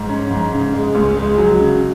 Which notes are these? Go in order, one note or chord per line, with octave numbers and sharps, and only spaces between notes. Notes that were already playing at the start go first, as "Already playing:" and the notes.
Already playing: G#2
C#4
G#2
C#3
G#3
C#2
G#3
F#3
C#3